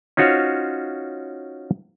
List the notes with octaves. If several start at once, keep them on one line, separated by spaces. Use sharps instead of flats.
C#4 D#4 F4 F#4 C5 C#5